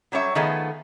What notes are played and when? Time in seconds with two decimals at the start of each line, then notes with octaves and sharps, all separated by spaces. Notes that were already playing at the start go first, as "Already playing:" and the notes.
0.12 F#3 G3 C#4 C#5 E5
0.35 D#3 F3 A3 B3 G#4